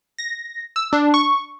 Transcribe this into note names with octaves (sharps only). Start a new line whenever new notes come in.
A#6
E6
D4
C#6